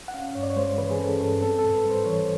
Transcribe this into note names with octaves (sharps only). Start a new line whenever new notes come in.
F#5
C#4 F5
G2 C#5
D5
C#5
G#3 C5
E3 B4
G#4
C#4 A4
G2 A4
C4 A4
A4
G#2
B4
G3 C5
E3 C#5